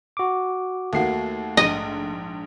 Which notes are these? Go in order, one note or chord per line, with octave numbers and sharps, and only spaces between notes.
F#4 D6
D#2 A3 A#3 F#4 C7
A#1 G#2 D#5